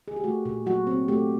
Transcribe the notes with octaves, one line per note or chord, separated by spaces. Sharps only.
G#4
G4
A3 F#4
A#2
F#3 F#4
C4
A3 G4